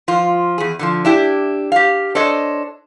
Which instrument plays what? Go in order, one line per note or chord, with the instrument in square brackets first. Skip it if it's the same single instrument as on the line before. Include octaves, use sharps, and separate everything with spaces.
[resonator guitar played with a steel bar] F3 F4
E2 G#4
D3 E3 F3
D4 E4 G4
G4 F5
D4 A4 C5 C#5 D#5